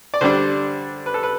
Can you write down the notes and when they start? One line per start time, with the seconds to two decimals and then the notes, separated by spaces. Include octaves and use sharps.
0.14 D5
0.21 D3 G3 D4 C5
1.06 B4
1.14 A4
1.23 B4